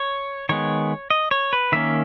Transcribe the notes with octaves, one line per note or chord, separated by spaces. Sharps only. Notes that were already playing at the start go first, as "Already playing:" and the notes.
Already playing: C#5
D#3 G#3 B3 C#5
D#5
C#5
B4
D#3 A#3 C#4 E5